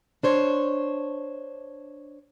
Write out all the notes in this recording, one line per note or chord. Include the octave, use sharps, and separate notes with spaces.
D4 C5 C#5